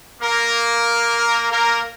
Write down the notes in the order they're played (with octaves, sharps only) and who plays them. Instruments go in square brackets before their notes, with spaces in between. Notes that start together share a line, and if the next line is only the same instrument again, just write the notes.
[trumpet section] A#3 A#4
A#3 A#4